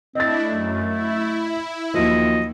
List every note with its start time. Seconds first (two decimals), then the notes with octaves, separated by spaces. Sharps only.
0.15 A3 C4 D4 E4 D#5 A6
0.48 F#2 A3
0.88 E4
1.94 D#2 F3 F#3 D#5